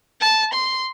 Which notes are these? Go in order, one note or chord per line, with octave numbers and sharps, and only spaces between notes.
A5
C6